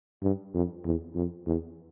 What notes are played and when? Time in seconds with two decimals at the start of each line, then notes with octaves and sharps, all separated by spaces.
0.22 G2
0.54 F2
0.85 E2
1.15 F2
1.47 E2